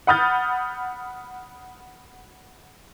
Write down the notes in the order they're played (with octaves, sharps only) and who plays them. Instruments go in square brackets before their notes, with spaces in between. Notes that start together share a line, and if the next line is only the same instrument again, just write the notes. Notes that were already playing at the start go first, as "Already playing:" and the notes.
[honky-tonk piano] F#5 B5 D#6 F6 G6 A6